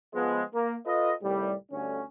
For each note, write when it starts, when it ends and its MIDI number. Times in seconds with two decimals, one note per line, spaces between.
0.14 0.42 53
0.14 0.42 56
0.14 0.42 59
0.54 0.75 58
0.86 1.12 65
0.86 1.12 69
0.86 1.12 71
0.86 1.12 75
1.22 1.53 36
1.22 1.53 45
1.22 1.53 51
1.22 1.53 55
1.71 2.02 38
1.71 2.02 43
1.71 2.02 50
1.71 2.02 61